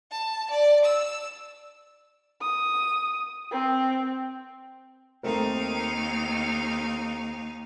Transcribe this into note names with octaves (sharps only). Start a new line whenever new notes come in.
A5
D5
E6
D#6
C4
D#2 A3 C4 D#4 A#4 F5